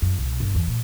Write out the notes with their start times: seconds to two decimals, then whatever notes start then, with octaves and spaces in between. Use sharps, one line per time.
0.02 F#2
0.18 C2 B2
0.40 G1
0.55 E2
0.67 A#2